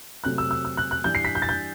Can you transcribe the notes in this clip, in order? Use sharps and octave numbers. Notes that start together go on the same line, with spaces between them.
C3 F#3 A3 C4 F#6
E6
E6
E6
F#6
F#6
G2 E3 G3 D4 G6
C7
B6
G6
A6
G6